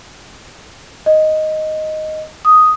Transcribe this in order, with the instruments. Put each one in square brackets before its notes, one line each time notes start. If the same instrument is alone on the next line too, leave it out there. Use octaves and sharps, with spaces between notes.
[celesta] D#5
[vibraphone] D#6